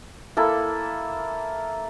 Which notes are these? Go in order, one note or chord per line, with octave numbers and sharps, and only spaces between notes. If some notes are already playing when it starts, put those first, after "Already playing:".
A#3 E4 A4